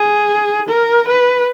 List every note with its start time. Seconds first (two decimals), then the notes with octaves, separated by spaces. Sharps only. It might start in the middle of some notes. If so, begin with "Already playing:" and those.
Already playing: G#4
0.68 A#4
1.08 B4